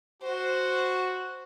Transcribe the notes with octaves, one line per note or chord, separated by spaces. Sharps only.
F#4 C5